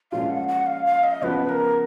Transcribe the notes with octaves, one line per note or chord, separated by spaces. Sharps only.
A#2 F3 G#3 C#4 F4 F5
F#5
F#5
F5
F5
D#5
C#3 F3 B3 B4
A#4